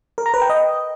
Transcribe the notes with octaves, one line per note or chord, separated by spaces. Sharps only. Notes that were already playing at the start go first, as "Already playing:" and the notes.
A#4
A#5
B4
G5
D#5